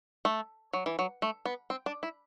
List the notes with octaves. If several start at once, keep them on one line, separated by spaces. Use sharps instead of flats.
A3
F#3
E3
F#3
A3
B3
C4
D4
E4